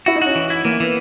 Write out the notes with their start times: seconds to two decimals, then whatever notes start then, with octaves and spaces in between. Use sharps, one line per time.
0.06 E4 F#4
0.16 D#4
0.22 C#4 F#4
0.35 E3
0.50 E4
0.65 E3 A#3
0.79 E3 B3